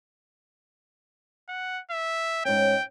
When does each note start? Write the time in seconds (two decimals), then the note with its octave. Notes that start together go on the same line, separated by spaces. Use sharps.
1.49 F#5
1.91 E5
2.45 G#2 C#4 G5